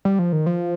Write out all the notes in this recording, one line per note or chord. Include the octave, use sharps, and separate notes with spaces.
G3
F3
D#3
F3